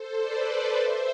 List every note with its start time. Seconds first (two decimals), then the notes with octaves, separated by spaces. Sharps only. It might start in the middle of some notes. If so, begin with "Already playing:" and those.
Already playing: A4 C5
0.18 B4 D5
0.76 C5 E5